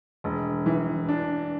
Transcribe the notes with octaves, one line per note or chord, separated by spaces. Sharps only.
E1
E3
D4